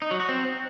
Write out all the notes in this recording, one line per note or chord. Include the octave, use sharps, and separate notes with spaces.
D#4
F#3
F#4
C4